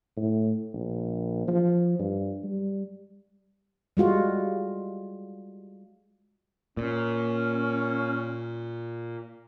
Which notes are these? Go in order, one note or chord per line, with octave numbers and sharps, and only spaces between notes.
A2
A#1
F3
G2
G3
G3 G#3 F4 F#4
A#2 C#4